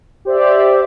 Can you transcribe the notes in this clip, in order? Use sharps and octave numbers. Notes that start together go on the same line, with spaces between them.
G4 C5 D5 E5